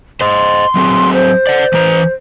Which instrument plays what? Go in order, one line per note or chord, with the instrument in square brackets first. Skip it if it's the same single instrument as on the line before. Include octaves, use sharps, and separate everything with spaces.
[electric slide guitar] C5 D#5 [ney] C6
[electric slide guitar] F#3 C4 G#4
[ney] C5
[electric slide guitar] D5 F#5
E3 B4 A#5